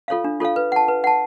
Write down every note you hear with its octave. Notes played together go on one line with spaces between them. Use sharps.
F4 A4 C#5 F5
D4
F4 A4 C#5 F5
B4
F#5 A5
B4
F#5 A5